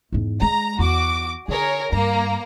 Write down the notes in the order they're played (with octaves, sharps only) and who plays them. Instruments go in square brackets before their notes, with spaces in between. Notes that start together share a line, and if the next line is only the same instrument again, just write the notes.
[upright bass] E2 G#2
[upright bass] G#3 [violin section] A#5
[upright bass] E2 [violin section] F#4 D6
[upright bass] D3 [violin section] G#4 A#4 C#5
[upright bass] G2 [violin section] A#3 A#5